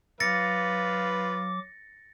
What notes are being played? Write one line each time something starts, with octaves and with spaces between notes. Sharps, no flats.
F#3 F4 B4 F5 D6 A6 A#6 C#7